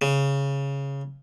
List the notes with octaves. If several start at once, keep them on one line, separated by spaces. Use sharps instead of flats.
C#3